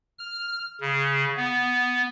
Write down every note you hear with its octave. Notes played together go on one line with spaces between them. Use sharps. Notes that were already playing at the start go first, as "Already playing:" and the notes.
F6
C#3
B3